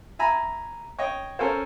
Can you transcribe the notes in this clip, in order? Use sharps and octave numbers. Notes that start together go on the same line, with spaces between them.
E5 G#5 A#5 B5
C#5 D#5 G5
C#4 A4 A#4 C5